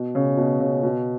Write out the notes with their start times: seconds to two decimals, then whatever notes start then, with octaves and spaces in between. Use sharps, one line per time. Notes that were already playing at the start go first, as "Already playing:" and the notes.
Already playing: B2
0.15 C#3
0.37 B2
0.60 C#3
0.83 B2